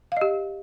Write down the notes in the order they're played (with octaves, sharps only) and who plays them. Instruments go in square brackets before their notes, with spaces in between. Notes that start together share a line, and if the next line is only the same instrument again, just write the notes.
[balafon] F5
D#5
G4